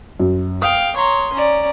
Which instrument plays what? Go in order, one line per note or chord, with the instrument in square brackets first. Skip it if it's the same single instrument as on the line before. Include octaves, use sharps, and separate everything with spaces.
[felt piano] F#2
[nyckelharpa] F5 G5 [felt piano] D#6
[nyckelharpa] C#5 C6 [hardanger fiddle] A#5
[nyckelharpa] C#4 [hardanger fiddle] D5 A#5